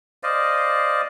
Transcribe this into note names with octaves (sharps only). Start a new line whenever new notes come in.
C5 D5 D#5 F5